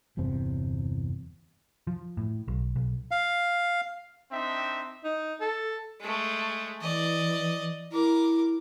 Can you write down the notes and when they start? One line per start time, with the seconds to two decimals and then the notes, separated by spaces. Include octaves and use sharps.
0.17 G1 E2 C3 C4
1.87 F3
2.17 A2
2.48 B1
2.76 B1
3.11 F5
4.32 C4 D4 D#4 E5
5.04 D#4
5.41 A4
6.00 G#3 A3
6.82 E3 D5 D#5
7.92 E4 A#4 D6